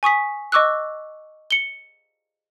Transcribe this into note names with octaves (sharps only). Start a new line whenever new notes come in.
G#5 C#6 D#6 B6
D#5 C#6 D6 E6 F#6
C#7 G7